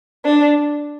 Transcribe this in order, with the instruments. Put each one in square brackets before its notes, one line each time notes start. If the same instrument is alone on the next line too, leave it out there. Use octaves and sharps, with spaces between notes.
[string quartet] D4